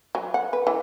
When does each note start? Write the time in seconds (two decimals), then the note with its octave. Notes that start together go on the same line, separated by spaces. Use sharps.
0.15 F#3
0.34 F#5
0.53 B4
0.67 E3